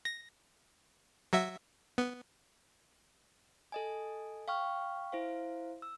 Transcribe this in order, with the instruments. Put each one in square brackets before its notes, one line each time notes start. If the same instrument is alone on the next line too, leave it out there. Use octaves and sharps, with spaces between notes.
[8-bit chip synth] A#6
F#3 F#4 E5
B3
[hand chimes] A4 D#5 G#5
F5 G5 C#6 F6
E4 C5 F5
E6